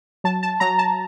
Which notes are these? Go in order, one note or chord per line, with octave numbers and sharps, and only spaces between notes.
F#3 A5
A5
F#3 A#5
A5